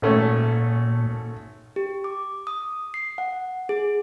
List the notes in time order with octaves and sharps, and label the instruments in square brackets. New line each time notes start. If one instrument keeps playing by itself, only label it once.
[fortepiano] G#1 A3 C#4 [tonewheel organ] A#2
[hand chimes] G4
D6
D#6
C7
F#5
G#4